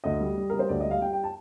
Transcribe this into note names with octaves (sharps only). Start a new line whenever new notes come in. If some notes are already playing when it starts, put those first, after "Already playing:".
D2 D#5
G3
G3
G3 A#4
C5
D2 D5
D#5
G3
F5
G3 G5
G5
A5